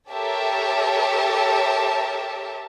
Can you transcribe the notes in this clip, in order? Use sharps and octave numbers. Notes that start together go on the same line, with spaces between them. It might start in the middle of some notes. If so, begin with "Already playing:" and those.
G4 A4 A#4 C#5 E5 A5